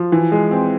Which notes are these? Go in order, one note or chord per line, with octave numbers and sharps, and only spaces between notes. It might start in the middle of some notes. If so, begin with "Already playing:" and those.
Already playing: F3
E3
G#3
C4